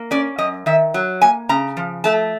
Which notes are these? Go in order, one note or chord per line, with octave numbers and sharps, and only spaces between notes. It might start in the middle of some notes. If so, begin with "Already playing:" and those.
Already playing: A#3
C#4 D5
F#2 D#5
D#3 E5
F#3
A#3 G#5
C#3 A#5
F3
A3 A5